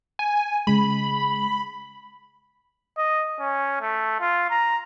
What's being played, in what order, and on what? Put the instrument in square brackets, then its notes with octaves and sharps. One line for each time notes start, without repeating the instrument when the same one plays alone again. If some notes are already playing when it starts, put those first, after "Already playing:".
[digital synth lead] G#5
[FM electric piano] C#3 G#3 [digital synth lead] B5
[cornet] D#5
C#4
A3
F4
A#5